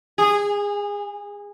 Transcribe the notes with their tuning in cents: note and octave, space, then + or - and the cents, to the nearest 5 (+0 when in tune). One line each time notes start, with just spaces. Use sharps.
G#4 -25